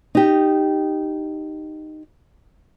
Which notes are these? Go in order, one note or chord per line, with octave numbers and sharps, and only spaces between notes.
D#4 G4